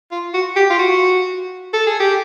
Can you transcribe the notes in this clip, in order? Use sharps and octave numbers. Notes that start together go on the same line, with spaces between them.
F4
F#4
G4
F4
F#4
A4
G#4
G4